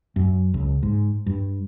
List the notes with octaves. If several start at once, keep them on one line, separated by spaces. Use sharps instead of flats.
F#2
C#2
G#2
G2